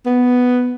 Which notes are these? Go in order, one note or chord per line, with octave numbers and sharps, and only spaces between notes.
B3